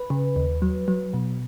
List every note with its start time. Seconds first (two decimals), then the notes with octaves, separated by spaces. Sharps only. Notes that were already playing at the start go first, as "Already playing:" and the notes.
Already playing: B4
0.10 C#3
0.36 D#2
0.62 F#3
0.88 F#3
1.14 B2